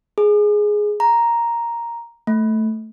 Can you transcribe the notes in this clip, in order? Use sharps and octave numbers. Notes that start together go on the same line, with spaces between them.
G#4
A#5
A3